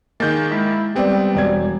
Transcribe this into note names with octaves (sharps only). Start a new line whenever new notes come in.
D#3 G#3 A#3 G6 A6
G#3 E4
G3 B3 C4 G4 B4 D5
E1 D5 G#6